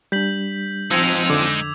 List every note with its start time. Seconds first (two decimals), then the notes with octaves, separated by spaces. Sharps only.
0.12 G3 D4 G6 B6 F#7
0.91 F3 G#3 C4 D#4 E6 G#6 F7
1.30 F2 D3 D6